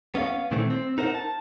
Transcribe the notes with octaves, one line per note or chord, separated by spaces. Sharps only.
B3 C#4 D#5 F5
A#2 D#3 E3 A3 C4
C4
D#4 A#4 C5 E5 F#5
A5